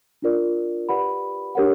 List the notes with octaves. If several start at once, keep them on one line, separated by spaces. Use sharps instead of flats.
D4 F4 A#4 D5
G4 B4 D5 F#5 B5
D4 G4 A#4 C#5 F#5